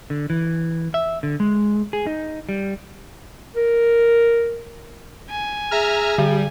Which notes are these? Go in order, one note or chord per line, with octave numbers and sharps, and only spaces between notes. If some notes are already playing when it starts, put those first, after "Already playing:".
D3
E3
E5
D3
G#3
G#4
D#4
G3
A#4
G#5
G#4 E5 A#5 F6
D3 G3